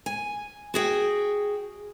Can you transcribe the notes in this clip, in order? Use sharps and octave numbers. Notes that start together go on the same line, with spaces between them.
G#5
F#4 G#4 G5